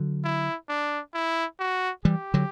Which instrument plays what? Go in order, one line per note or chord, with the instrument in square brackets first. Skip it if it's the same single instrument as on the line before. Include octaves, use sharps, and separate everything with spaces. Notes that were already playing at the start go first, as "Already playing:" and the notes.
Already playing: [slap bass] D3 F#3
[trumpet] E4
D4
E4
F#4
[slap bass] E3 G3 [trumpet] G4
[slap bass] D3 F#3